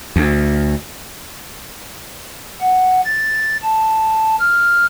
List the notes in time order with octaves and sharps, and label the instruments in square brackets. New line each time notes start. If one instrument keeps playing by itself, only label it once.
[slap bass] D2
[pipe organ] F#5
A6
A5
F6